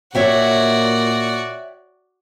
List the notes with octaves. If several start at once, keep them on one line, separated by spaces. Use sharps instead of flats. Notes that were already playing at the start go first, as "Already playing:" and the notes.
A#2 F#4 C#5 D5 E5 G5